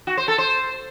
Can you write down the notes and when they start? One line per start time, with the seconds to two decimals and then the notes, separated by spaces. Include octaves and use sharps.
0.07 F#4
0.17 C5
0.28 A4
0.38 C5